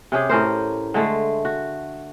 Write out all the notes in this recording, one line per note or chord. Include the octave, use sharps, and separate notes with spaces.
C3 C#4 G4 G#4
A2 C#4 A#4 C5
D3 G#3 A3
F#4